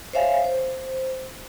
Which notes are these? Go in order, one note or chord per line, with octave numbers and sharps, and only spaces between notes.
C5 C#5 E5 F5 G#5
C5